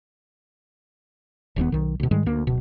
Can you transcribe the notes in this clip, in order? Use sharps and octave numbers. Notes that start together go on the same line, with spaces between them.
D#1 D#2 A#2 B3
B1 D#3
D2 B2
G#2 D#3 G3 G#3
D2 A#3
D1 B2